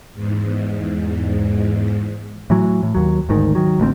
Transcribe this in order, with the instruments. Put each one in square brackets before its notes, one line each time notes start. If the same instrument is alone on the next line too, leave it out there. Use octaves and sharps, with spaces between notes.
[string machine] E2 G#2
[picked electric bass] A2 E3 F#3
A2
D#2 F#3
G#1 D2 G#2 D#3
D#3 F#3
A1 D2 A3 C4